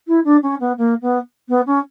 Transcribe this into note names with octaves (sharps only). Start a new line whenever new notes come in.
E4
D4
C#4
B3
A#3
B3
B3
C#4